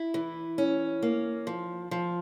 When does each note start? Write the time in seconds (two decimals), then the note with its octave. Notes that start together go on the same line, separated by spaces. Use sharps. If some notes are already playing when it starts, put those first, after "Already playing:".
Already playing: E4
0.14 E3
0.58 C#4
1.02 A#3
1.47 F3
1.91 F3